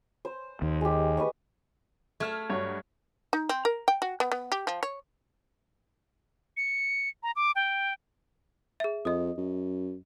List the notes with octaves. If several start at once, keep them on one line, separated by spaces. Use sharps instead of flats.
C5
D#2
G#3 G4
B4 D#5 C#6
A3 E5 F6 G#6
G2 F#3 C#5
D#4
C4
A#4
G5
F#4
B3
B3
G4
F3
C#5
C#7
A#5
D6
G5
G#4 E5
F2 D#5 D#6
F#2